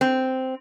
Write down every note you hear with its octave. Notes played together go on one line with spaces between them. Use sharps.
C4